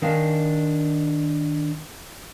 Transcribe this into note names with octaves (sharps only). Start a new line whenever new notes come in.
D#3 D4 F5 G#5